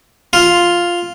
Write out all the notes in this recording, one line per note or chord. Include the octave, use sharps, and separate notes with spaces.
F4